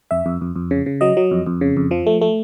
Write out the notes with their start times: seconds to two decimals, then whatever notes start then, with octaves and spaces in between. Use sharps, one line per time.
0.11 F2 E5
0.26 F2
0.41 F2
0.56 F2
0.71 C#3
0.86 C#3
1.01 F#3 D#5
1.17 F#3
1.31 F2
1.46 F2
1.61 C#3
1.77 F2
1.91 F3
2.07 A3
2.22 A3